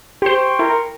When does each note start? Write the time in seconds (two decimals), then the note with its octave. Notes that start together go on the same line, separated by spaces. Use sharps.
0.22 G4 C5 G5 C6 C#6
0.59 E4 A#4